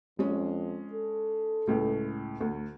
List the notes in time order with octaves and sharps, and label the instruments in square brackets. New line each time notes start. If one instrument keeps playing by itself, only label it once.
[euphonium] F2 [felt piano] G#3 C#4
[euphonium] A4
[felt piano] C#2 A2
D2